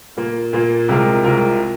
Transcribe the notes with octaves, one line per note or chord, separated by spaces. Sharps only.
A#2 A#3 F4
A#2 A#3 F4
C2 C3 G#3 F4 A#4
C2 C3 G#3 F4 A#4